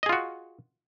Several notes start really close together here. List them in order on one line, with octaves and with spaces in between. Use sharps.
D#5 G#4 F4 F#4